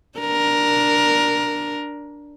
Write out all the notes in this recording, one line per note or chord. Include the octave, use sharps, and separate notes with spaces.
D4 A#4